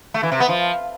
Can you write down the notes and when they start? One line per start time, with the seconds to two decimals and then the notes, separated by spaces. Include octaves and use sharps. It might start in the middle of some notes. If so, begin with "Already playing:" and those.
0.14 A3
0.23 E3
0.32 C3
0.40 B3
0.49 F3